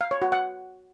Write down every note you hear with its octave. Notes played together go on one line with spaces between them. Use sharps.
F5
C#5
F#4
F#5